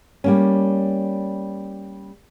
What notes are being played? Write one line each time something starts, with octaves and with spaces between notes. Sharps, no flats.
G3 A#3 C#4